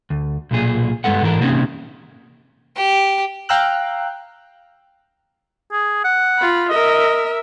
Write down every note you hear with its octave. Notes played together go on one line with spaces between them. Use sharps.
D2
B1 A#2 G#4
G2 G#3 B3 A4 F#5
G#2 E3 A4 A#4
C3 A#3 C4 C#4 D#4
G4
F5 G5 A#5 E6 F#6
G#4
F#5
F4 B5
A#4 D#5 E5